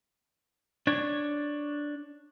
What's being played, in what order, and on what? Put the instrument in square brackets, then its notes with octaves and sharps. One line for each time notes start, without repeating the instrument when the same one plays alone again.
[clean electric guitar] D4 C#5